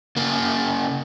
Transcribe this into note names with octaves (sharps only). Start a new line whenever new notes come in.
C#3 A#3